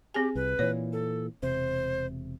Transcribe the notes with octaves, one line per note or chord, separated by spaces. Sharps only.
C4 G4 G#4 G#5
C2 B4
A#2 E3 C#5
A4
E1 C3 C5